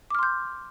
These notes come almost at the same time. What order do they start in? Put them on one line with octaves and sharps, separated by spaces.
D6 F6 C6 G6